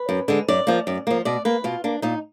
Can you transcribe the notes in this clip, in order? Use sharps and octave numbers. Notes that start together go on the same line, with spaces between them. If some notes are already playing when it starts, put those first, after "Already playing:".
Already playing: B4
F#2
D3 G#3
F#2 D5
F3 A#3
F#2
F3 A#3
B2 D5
A#3 B4
B2 F4
A#3 D4
A#2 D#4